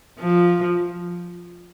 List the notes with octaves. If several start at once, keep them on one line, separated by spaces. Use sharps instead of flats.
F3